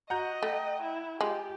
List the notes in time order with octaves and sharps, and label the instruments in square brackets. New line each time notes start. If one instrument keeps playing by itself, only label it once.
[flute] F#4 [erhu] D#5 [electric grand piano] F#5 A#5 G6
[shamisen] A3 [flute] G5
[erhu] E4
[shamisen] G#3 [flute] F4 [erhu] G4